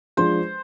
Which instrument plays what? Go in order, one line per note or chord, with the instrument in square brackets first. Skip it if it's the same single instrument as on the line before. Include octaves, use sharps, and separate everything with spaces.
[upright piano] F3 G#3 D4 [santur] C5